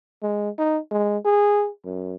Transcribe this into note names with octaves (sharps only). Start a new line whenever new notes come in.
G#3
D#4
G#3
G#4
F#2